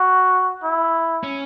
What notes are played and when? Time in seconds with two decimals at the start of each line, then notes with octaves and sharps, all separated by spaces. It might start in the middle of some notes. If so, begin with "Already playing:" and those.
Already playing: F#4
0.64 E4
1.23 C#4